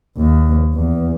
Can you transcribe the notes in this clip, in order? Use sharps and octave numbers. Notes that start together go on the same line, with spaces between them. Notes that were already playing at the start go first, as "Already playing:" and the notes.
D#2
E2